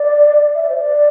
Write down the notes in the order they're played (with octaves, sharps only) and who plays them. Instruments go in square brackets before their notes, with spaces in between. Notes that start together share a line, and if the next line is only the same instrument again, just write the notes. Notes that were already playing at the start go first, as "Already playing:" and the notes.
Already playing: [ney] D5
E5
D5
C5
D5